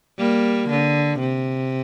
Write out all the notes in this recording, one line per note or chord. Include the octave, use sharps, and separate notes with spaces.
G3 A#3
D3
C3